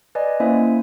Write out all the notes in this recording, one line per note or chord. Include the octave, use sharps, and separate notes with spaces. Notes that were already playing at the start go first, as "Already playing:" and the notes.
B4 D5 D#5 G#5
A#3 C#4 E4 C5 E5 G#5